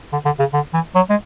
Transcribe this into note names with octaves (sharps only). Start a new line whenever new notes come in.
D3
D3
C#3
D3
E3
F#3
G#3